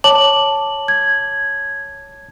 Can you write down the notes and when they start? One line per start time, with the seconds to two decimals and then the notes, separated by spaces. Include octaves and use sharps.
0.04 C#5 A5 D6 F#7
0.88 G#6